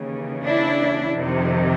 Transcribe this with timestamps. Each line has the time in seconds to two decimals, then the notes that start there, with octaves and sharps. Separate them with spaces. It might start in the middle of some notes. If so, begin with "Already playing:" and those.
Already playing: D#2 C#3 E3
0.43 D4 E4
1.14 F2 C3 D#3